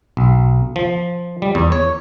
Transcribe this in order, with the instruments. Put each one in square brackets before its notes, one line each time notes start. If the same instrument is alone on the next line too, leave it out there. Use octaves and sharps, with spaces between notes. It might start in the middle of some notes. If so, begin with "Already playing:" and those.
[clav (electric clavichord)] B1
F3
G3
E2
C#5